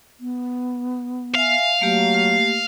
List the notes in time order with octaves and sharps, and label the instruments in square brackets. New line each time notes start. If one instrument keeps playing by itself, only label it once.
[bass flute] B3
[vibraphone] E5 G#5 [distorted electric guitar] F5
[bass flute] F#3 [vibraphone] A3 A#3 G4